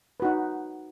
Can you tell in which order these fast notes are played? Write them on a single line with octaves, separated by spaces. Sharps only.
B4 F#4 D#4